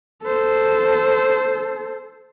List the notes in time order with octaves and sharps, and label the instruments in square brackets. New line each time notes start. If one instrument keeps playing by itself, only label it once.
[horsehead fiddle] A4 C5